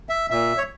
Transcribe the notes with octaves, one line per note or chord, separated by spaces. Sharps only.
E5
A#2 E5
C#5